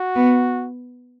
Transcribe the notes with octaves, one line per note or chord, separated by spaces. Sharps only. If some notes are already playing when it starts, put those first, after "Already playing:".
Already playing: F#4
B3